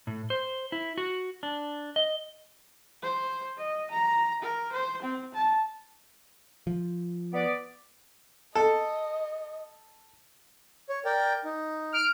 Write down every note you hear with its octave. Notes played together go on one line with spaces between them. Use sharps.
A2
C5
E4
F#4
D4
D#5
C5
D#5
A#5
A#4
C5
C4
A5
F3
B3 D5
A4 D#5
C#5
A#4 D5 G5
D#4
F6 D7